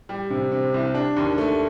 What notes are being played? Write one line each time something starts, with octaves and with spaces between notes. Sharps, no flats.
G3
C3
C3
C2
D4
D#2
A3